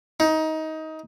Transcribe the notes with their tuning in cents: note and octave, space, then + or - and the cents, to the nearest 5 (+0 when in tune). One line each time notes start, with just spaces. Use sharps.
D#4 +20